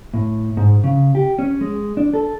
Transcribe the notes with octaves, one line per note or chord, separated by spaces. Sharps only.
A2
G#2
C#3
G4
C#4
G#3
D4
A4